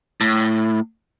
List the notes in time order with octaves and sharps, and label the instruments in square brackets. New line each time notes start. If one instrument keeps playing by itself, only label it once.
[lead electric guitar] A2